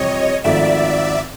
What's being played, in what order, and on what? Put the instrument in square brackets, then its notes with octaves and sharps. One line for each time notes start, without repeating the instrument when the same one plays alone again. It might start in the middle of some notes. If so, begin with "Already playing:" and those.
Already playing: [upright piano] F2 C3 E3 G3 C4 [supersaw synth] C#5 D#5
[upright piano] G#1 G#2 F3 A3 [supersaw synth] D5 E5